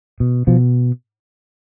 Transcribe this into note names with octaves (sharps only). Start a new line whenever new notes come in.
B2
B2 F3